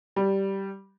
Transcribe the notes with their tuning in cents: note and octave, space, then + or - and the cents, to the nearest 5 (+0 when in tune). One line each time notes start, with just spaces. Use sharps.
G3 -10